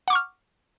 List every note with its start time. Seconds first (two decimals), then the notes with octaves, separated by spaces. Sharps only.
0.08 F#5
0.10 D6
0.13 C#6
0.15 F6